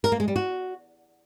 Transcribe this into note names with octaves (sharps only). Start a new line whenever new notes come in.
A#4
A#3
G#3
G3
F#4